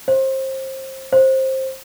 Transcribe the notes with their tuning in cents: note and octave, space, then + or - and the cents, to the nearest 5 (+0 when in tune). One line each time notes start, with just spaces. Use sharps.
C5 +25
C5 +15